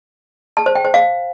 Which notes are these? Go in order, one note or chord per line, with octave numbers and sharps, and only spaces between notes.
A5
C5
G5
C5
F5